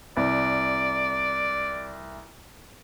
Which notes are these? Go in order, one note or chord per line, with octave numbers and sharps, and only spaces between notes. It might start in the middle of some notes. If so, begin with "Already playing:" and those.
C2 D5